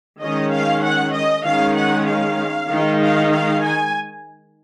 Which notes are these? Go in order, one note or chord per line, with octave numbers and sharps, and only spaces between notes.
D#3 G#3 C#4 D#5
F5
F#5
D#5
D#3 G#3 C#4 F5
F#5
F5
D#3 G#3 D#4
F5
F5
G#5